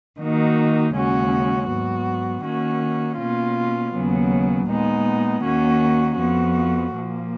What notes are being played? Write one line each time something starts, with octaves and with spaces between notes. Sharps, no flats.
D#3 A#3 D#4 F#4
D#2 C#3 G#3 C#4 F#4
G#2 F#3 B3 F#4
D#3 A#3 C#4 F#4
B2 A#3 C#4 F4
D#2 C#3 F#3 B3
A#2 G#3 B3 D#4
D#2 D#3 A#3 C#4 F#4
F2 F3 B3 F#4
A#2 F3 A#3